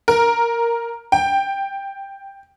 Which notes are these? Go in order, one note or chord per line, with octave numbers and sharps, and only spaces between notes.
A#4
G5